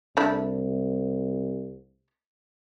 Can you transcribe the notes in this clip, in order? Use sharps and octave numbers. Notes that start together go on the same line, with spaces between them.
C2 A3 D4 E4